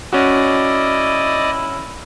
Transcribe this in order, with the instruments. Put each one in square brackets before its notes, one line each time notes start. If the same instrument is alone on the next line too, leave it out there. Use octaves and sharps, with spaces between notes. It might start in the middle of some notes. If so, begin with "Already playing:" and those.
[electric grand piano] C#4 F#4 [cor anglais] E4 [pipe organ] D5 D#5